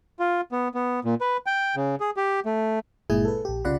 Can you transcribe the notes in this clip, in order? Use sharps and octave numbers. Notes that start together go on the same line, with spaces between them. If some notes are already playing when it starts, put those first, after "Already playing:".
F4
B3
B3
A#2
B4
G5
C#3
G#4
G4
A3
G1 A#2 G#3 E4 G#4 G#5
A4 B4
A#1 G4
C2 C#3 F4 D5 F#5 B5